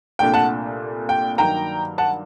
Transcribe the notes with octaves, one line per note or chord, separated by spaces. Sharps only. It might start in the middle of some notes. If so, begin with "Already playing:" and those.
C2 A#2 A3 D4 G5
F#5 A5
G5
G2 D#3 F#3 A#3 G5 A#5
F#5 A5